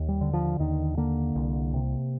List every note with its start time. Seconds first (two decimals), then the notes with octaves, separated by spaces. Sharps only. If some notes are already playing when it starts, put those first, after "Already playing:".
Already playing: D#2
0.09 G3
0.21 D3
0.33 F3
0.59 D#2 D#3
0.97 D3 A#3
1.35 C2
1.74 C3